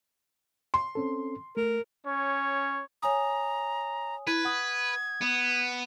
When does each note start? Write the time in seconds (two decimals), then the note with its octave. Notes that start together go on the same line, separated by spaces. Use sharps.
0.74 C6
0.95 C4 C#4 A4
1.57 A3 A#4
2.05 C#4 C#5
3.02 C#5 G#5 A#5 D#6
4.27 E4 B4 G#6
4.45 F#5 D#6
5.21 B3